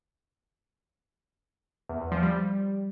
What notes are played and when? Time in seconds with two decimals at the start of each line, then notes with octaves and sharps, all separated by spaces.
1.89 E2
2.01 E2
2.12 F3
2.23 G3